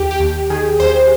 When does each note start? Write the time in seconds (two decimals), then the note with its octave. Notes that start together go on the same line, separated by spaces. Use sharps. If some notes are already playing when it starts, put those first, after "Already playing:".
Already playing: D#2 G4
0.11 G4
0.20 D#2
0.50 D#3 G#4
0.80 D#2 C5